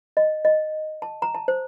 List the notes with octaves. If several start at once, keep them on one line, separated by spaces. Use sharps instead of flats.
D#5
D#5
A5
A#5
A5
C5